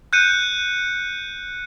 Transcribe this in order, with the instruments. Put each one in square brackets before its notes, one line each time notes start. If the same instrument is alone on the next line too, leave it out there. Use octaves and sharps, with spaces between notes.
[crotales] F#6 G6 C#7 D#7